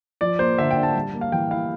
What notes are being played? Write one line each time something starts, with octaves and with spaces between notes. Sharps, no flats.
F3 D5
A#3 C5
D3 E5
G5
D4
A5
G3
A#3
F5
E3 G5
E4 F5